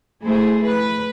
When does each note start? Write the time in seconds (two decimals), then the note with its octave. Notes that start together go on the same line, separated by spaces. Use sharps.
0.24 A3 E4 G#4 C5
0.64 B4